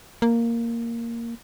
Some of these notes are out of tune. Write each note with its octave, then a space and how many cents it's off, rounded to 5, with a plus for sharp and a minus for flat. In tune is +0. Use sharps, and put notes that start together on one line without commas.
A#3 -5